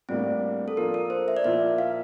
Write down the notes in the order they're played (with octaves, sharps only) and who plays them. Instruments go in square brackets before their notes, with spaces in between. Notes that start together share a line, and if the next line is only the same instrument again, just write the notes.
[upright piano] A2 G3 A#3 D4 [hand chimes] C4
[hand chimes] A4
[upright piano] F3 A#3 D4 [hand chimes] A#4
[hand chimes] A#4
C5
E5
D5
[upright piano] A#2 F3 A#3 E4 [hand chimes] E5
[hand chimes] F5